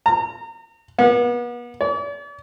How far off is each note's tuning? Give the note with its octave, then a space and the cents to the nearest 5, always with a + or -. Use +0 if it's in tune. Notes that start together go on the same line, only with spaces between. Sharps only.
A#5 -35
B3 -40
D5 -45